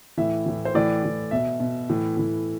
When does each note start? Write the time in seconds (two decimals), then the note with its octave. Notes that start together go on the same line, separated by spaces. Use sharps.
0.17 A2 E3 E5
0.46 A2 E3
0.65 C5
0.75 A2 E3 D5
1.03 A2 E3
1.31 B2 E5
1.60 B2
1.89 A2 E3
2.17 A2 E3